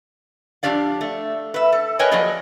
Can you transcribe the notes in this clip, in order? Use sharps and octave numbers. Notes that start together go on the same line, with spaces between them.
F2 F3 D4 G4 D5 F5
A3
B4 E5
A4
A#4 B4 C#5 D#5 G5 G#5
F3 F#3 A#3 G#4 D5 D#5